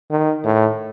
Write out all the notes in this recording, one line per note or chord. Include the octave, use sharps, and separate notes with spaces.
D#3
A2